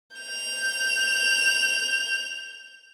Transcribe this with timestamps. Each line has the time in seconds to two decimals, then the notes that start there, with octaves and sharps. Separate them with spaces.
0.17 G6 F7